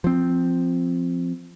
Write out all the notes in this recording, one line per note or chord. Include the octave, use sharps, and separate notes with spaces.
F3 C4